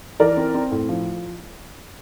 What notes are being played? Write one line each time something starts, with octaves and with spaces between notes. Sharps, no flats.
E3 A#4 D5
C4
C4
A2
F3